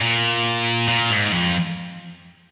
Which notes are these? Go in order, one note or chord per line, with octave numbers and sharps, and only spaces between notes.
A#2
A#2
G#2
F2